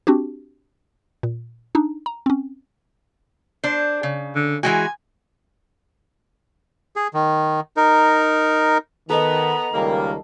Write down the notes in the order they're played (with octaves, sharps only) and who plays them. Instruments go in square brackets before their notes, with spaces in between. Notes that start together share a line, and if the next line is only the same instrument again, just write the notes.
[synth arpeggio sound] C4 D4 F#4 G4
A#2
D4 D#4
A#5
C4 C#4
[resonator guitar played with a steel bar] D4 C5
C#3
[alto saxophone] D3
[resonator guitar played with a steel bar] E3 G#3 F#4 [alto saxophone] G#5
[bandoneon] G#4
D#3
D#4 A#4
[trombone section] D#3 [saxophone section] B3 [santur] A4 D#5 [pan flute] A#5
[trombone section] C#2 D#3 G3 [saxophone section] A#3